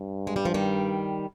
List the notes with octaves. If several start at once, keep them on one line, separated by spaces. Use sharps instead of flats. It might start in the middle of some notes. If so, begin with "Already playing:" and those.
Already playing: G2
G#3
G3
F3
D#3 G3